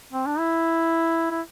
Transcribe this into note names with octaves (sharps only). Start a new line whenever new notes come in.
C4
D4
E4
E4